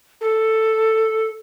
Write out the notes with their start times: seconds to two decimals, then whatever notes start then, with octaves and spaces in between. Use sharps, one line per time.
0.21 A4